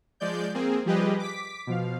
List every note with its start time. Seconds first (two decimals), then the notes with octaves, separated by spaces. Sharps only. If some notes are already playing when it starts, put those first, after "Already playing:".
0.20 F3 G#3 D5 G6
0.54 A#3 C4 G#4
0.86 F3 G3 G4 G#4 B4 D#5
1.19 D6 B6
1.67 B2 F3 F5